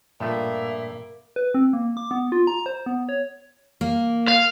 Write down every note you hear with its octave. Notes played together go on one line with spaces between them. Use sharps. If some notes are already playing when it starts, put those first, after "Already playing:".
G2 A#2 F3 A3 A#3 E5
B4
C4
A#3
D6
B3
F4
A#5
C5
B3
C#5
A#3
F5